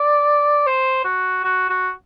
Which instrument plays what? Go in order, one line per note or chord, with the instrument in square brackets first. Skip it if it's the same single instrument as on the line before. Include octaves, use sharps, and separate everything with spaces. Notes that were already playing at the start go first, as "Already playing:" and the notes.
Already playing: [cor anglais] D5
C5
F#4
F#4
F#4